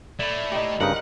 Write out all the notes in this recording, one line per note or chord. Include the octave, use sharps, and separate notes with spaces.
A3 E4 D5 B5
D#4 G4
G2 C#3 D#4 A#4 B4 F#5